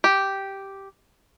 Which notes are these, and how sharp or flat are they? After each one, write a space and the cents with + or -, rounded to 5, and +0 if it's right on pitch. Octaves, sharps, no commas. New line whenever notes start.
G4 -5